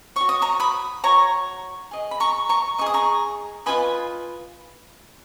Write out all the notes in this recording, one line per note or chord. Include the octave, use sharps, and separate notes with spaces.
F#4 C#5 C#6
D#6
A#5 C#6
B5 D#6
F#4 C#5 A#5 C#6
G#4 D#5
B5
A#5 C#6
A#5 C#6
G#4 D#5 C#6
D#6
A#5 C#6
F4 G#4 B4 D#5 G#5 B5